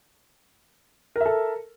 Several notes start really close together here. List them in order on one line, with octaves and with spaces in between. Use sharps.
A#4 E5 A4